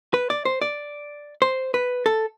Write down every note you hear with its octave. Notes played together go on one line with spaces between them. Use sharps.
B4
D5
C5
D5
C5
B4
A4